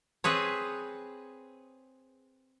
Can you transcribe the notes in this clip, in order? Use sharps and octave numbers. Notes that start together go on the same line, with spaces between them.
C4 G#4 B4 C#5